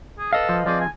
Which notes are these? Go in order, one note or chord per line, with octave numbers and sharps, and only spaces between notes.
G#4
A4 B4 D#5 F5
F3
F3 C4 G#4 D5
G#5